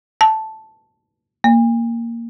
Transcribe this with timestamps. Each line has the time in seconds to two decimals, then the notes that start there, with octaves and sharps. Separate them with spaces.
0.21 A5
1.44 A#3